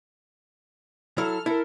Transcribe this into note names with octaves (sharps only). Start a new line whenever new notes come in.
F#3 E4 A4 F6
E4 A4 A#4